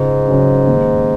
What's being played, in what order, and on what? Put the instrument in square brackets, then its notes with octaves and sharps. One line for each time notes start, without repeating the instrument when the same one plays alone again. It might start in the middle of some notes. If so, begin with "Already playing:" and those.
Already playing: [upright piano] C#2 [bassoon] G#2
[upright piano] C#3 F#3 C#4
D#2